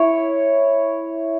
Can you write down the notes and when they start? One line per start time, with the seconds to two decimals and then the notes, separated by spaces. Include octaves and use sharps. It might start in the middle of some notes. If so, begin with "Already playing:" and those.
Already playing: E4 C#5